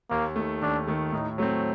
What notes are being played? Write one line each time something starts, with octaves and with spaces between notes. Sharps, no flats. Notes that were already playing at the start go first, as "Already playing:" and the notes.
D#2 A#3
D#3 A3
D#2 D4
D#3 A3
A2 D#4
F#3 A3 C4